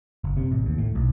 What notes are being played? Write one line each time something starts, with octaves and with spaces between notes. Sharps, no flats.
F#1
C3
A1
D#2
A2
B1